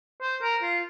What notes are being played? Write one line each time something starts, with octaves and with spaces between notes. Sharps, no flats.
C5
A#4
F4